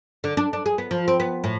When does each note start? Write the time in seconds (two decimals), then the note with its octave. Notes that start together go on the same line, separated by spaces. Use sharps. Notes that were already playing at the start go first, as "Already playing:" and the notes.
0.24 D3
0.37 D4
0.53 D4
0.66 G#4
0.78 B3
0.91 F3
1.08 C4
1.20 B3
1.44 A2